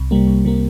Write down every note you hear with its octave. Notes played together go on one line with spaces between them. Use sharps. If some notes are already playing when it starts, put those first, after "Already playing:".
Already playing: C2
C3 G3 A#3
C2
C3 G3 A#3